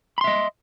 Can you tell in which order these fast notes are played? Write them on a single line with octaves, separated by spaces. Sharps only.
B5 C6 E5 D#5